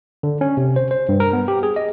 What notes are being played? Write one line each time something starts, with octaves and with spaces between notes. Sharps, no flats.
D3
C#4
C3
C5
C5
G2
A#4
B3
G4
G#4
D#5